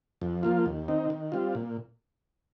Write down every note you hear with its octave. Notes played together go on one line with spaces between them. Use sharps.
F2
F3 A#3 F4
D#2
D#3 C4 D#4
D#3
G3 C4 F4
A#2